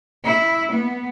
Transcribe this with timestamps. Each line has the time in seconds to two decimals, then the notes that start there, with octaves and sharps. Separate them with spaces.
0.24 E4
0.72 B3